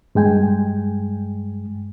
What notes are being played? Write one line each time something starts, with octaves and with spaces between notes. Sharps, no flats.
G2 G#3 G5 G#5